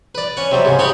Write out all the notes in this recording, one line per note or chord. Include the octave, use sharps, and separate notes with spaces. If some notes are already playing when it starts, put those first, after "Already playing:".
B4 D5
C#4 F#5
C3 F#3 G3
G#2 C#3
D#4 G4 C#5 F#5 B5